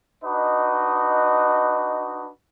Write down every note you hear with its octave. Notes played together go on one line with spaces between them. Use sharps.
D4 D#4 F#4 B4 D#5